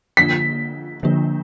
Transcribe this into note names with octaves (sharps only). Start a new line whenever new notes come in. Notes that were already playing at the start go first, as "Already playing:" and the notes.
D3 F3 A#3 D4 F4 B6
D3 F3 A#3 D4 F4